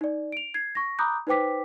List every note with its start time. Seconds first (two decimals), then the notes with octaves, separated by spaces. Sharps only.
0.01 D#4 D5
0.32 D7 F7
0.54 G#6 C7
0.75 C#6 A#6
0.99 A#5 B5 D6 D#6 F#6 G6
1.27 D#4 B4 C5 G5 D6 B6